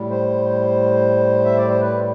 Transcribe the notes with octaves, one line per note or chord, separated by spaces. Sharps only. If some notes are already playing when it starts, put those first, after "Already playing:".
Already playing: A2 G3
C5
E5
D5
C5
B4